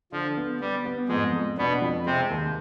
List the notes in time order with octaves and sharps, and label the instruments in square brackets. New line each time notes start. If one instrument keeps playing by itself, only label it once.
[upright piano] D3 [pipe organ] F3
[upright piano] B3
[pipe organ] G3 [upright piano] B3
[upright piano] B3
[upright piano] F2 [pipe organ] G#2 G#3
[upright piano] F2
[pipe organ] B2 B3 [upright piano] D4
[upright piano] F2
[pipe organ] C3 C4 [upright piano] G#3
[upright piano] D#2